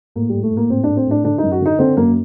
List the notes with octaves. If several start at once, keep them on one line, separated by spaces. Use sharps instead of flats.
A2 A#3
G3
A2
A3
A2
A#3
A2 C4
A2 D4
C4
A2 D4
D3 D4
D#4
F#2
F#4
D3
D#4
D3 C4
F#2 A#3